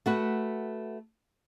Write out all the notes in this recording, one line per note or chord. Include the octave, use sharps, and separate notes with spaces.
A3 F#4 B4